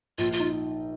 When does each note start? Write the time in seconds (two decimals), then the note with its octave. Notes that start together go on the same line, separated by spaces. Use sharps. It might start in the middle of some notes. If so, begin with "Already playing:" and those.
0.18 A#1 F4
0.33 F4
0.40 D#4